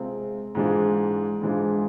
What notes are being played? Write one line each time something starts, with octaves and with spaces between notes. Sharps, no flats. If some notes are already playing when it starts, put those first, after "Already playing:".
Already playing: C3 G#3 C4 F4
G#2 E3 G#3 D4 F4
G#2 E3 G#3 D4 F4